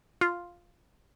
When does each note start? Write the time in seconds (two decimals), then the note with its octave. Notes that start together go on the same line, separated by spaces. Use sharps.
0.21 F4